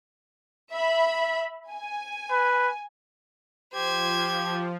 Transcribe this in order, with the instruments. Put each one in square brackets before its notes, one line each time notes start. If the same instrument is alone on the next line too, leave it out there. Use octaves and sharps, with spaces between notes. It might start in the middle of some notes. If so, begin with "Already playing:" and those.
[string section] E5 B5
G#5
[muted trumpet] B4
[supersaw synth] F3 [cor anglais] G4 [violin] C5 G#6